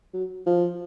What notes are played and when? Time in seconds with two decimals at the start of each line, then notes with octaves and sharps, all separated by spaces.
0.14 F#3
0.46 F3